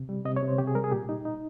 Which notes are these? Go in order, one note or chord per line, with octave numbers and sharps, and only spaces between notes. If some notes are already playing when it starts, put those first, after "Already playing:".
Already playing: C3
G3
C3 D#5
C#5
C3
C5
C3 G4
G#4
G3 A#4
G#4
A#2 G4
D#4
D#4